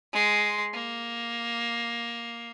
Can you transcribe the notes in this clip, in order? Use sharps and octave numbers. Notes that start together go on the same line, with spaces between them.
G#3 C6
A#3